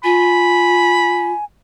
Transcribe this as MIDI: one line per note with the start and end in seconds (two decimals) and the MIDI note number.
0.04 1.32 65
0.04 1.44 80
0.04 1.38 83